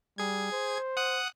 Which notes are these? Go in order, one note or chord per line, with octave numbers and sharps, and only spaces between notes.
G3 G#4 G#6
C5
F#5 D#6 F#6